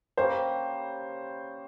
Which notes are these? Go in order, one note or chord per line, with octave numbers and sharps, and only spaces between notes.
G3 A#3 C#4 C5